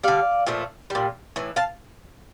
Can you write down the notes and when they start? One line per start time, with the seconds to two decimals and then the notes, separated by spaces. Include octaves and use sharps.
0.03 D3 G3 D5 F5
0.47 A#2 F3 A3
0.90 A#2 G3
1.36 A2 E3
1.56 F5 A5